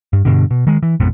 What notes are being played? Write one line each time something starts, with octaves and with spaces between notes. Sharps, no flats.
G2
G2 B2 D3
B2
D#3 G#3
E3
A1 F2 G#2 B2